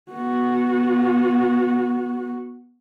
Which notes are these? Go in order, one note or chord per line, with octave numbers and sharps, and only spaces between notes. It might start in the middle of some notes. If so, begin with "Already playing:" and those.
B3 F#4